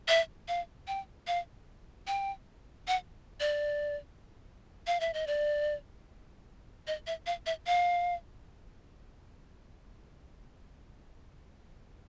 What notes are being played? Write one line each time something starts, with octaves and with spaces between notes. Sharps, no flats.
E5
F5
G5
F5
G5
F#5
D5
F5
E5
D#5
D5
D#5
E5
F5
E5
F5